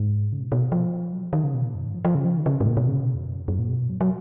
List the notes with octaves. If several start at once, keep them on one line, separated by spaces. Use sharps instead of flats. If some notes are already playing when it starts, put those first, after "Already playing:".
Already playing: G#2
C#3
B2
B2
F3
F#3
F3
D#3
C#3
B2
A#2
F#2
G#2
F3
F3
C#3
F3
D#3
C#3
G#2
A#2
B2
C#3
B2
F2
F#2
F2
F#2
A#2
B2
F#3
F#3